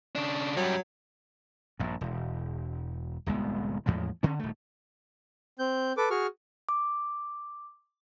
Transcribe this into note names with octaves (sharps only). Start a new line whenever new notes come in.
C#3 D4
F#2 F#3 G3
A#1 G2
E1
D1 C2 G#3 B3
E2 A2 F3 G#3
D3 C#4
D#1 A3
C4 G6
A4 B4 D6
F#4 G#4 C#6 F6
D6